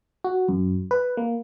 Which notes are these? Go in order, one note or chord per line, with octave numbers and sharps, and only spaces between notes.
F#4
F#2
B4
A#3